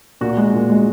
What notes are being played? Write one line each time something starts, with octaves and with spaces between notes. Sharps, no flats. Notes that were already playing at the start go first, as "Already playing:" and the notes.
A#2 F#4
G#3
A#2
G#3